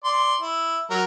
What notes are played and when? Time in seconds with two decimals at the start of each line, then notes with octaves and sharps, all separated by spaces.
0.04 D5 C6
0.41 E4
0.90 F#3 A#4